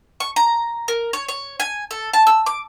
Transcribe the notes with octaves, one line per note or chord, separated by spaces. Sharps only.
C#6
A#5
A#4
C#5
C#5
G#5
A4
A5
E6
D6